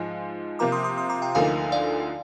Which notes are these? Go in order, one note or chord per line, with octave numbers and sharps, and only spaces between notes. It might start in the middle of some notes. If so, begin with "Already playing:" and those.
Already playing: G#2 F3 G#3
C3 F3 A#3 F4 A#5 D6
C6 D#6
C6 D#6
C6 D#6
A#5 D6
G5 A#5
D2 D3 F3 A#3 D#4 F5 G#5
D5 F5